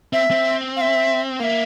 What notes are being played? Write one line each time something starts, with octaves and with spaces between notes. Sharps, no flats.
C4 E5
C4
F5
E5
A#3 E5 F5